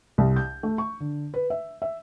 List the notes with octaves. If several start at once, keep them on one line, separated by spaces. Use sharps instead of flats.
C2
G6
A3
C#6
D3
B4
E5
E5